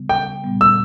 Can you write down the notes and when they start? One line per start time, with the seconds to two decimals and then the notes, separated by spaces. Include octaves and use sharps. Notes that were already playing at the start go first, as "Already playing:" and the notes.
Already playing: C#3 G3 B3
0.09 G5
0.43 A#2 G3 B3
0.61 E6